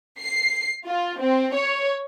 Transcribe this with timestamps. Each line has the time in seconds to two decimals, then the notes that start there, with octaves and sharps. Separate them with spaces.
0.21 C7
0.86 F4
1.20 C4
1.56 C#5